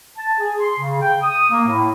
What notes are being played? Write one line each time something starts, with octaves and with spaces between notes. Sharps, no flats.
A5
G#4
C6
C#3
G5
D#6
A#3
A2